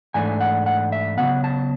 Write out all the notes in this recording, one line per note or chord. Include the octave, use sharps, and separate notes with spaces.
G#2 E3 A3 D4 G#5
F#5
F#5
E5
C#3 F#3 B3 F#5
A5